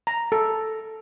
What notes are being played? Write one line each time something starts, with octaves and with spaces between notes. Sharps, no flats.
A#5
A4